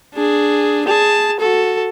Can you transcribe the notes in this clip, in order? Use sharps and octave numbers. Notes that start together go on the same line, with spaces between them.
D4 G#4
G#4 A5
F#4 A4